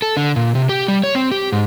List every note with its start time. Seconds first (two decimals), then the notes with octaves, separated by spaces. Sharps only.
0.02 A4
0.17 D3
0.36 A#2
0.55 C3
0.69 G4
0.88 G3
1.04 C#5
1.15 C4
1.32 G4
1.52 G#2